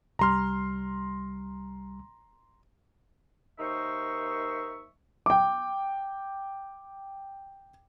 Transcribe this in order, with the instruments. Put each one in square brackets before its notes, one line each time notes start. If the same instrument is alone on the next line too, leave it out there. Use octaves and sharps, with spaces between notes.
[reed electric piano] C2 G3 F6 [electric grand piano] A#5 C6
[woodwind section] D#2 D#4 A#4 C5 E5 C#6
[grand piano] G5 D6